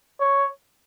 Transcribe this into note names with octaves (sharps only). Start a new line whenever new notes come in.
C#5